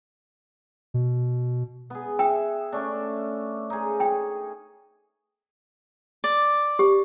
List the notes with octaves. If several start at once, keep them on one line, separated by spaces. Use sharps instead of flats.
B2
B3 G#4
E5 G5
A3 C#4 D4
D#4 G#4
G5
D5
G4